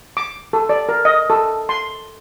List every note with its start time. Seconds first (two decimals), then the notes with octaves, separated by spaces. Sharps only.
0.17 D6
0.53 A4
0.69 D5
0.89 A#4
1.05 D#5
1.30 A4
1.69 C6